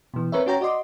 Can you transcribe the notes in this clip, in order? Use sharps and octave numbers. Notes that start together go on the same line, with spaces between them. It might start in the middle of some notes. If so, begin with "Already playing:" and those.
B2 E3
C4 A#4 B4 C#5 E5
C#4 F#4 C#5 G5 A#5
F#4 D5 D#5 C6 D6